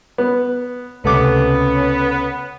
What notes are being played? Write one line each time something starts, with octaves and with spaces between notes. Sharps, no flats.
B3
C#2 C3 A3 B3 C#4 D6